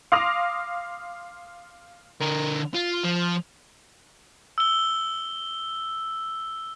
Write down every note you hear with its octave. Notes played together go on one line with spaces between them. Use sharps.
F5 C6 D6 D#6 A#6 F7
D3 A#4
F4
F3
E6 G7